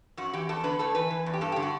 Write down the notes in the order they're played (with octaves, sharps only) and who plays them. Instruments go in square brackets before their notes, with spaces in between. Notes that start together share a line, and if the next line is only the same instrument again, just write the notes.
[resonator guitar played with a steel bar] F#2 F#4
E3 G4
E2 A4
D3 B4
A2 A4
E3 B4
E3
E2
G4
G2 A4
D3 G4
F#4